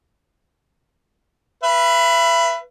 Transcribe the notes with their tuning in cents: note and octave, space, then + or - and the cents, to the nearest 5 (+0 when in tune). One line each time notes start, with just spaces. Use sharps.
B4 +0 E5 +35